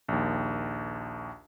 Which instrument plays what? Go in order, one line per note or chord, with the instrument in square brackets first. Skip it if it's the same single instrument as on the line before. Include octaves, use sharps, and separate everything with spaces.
[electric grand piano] A#1 D#2